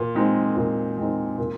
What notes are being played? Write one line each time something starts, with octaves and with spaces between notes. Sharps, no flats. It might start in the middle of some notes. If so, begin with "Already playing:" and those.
Already playing: A#2
G#3 C4 D#4
A#2
G#3 C4 D#4
A#2